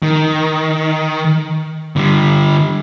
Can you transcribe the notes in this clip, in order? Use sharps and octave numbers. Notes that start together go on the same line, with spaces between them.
D#3
D3 G3